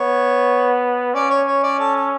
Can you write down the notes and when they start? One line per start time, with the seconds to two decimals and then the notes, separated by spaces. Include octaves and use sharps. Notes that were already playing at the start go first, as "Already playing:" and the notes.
Already playing: B3 C#5
1.14 C#4 D5
1.30 C#5
1.47 C#5
1.63 D5
1.79 A4
1.96 A4